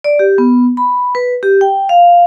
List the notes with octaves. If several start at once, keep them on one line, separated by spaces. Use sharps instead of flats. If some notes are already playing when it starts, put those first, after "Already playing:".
D5
G4
B3
B5
B4
G4
G5
F5